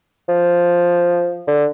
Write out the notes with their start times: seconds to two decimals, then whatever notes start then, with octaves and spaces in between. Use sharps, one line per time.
0.29 F3
1.47 D3